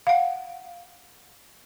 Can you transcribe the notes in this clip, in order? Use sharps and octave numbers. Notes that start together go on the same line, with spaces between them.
F5 F#5